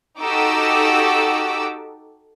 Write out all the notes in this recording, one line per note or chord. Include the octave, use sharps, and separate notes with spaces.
D#4 F#4 G4 A4 D6 E6